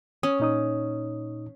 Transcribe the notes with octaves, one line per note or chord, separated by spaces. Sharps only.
C#4 D#6
A#2 D#4 D#6